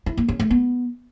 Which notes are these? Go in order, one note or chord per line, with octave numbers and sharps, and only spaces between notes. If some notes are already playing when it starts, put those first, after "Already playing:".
E4
A#3
C#4
A3
B3